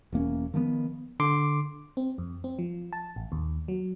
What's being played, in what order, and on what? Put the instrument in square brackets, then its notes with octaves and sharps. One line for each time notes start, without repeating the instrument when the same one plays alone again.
[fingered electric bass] E1 E2 A#3 C#4
D#3 F3 A3 B3
[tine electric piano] D3 C6 D6
[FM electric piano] C4
F2
C4
F3
A5
A1
D#2
F#3